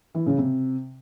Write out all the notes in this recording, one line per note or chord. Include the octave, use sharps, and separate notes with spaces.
E3
C#3
C3